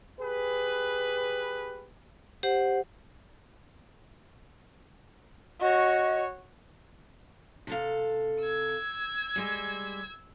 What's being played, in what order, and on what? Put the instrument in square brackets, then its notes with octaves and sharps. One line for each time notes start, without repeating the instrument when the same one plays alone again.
[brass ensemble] G4 G#4 B4
[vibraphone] G4 C5 F#5
[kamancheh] F#4 C#5 [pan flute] D#5
[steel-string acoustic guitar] C3 A4 F5
[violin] E6 G#6
[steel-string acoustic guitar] G3 G#3